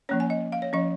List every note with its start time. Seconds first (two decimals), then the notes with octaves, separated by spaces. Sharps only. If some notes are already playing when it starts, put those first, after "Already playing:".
0.09 F3 A#3 C#4 C#5
0.20 G#5
0.30 D#5
0.52 F5
0.62 C#5
0.73 F3 C#4 D#5